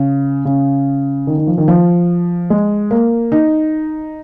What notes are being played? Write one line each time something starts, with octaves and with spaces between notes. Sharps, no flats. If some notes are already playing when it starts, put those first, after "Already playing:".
Already playing: C#3
C#3
D#3
D#3
F3
D#3
F3
G#3
A#3
D#4